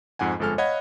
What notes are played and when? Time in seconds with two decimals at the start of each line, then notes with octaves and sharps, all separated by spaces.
0.19 F2 G#2 F#5 G#5
0.39 G1 F2 G#3 A4 G#5 F6
0.58 C#5 D#5 F5 F#5 B5 G#6